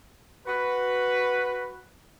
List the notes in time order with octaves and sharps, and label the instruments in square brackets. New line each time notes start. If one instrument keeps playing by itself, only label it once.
[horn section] F#4 B4